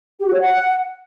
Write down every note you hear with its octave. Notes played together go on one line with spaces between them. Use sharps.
G4
F#4
C#5
F#5